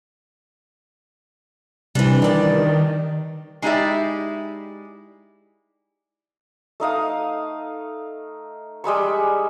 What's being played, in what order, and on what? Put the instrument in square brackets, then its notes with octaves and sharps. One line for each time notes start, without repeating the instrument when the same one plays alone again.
[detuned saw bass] C3 [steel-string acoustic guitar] E3 G3 [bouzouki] D4
[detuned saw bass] D#3 [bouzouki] D4 D5
[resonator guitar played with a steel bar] G#3 D#4 E4 G4 D5 E5
[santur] A3 D#4 F5 D#6
G3 G#3 B5 C#6